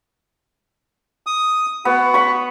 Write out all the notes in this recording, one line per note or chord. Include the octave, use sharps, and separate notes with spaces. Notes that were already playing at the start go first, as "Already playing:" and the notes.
D#6
B3 F#4
B5 C#6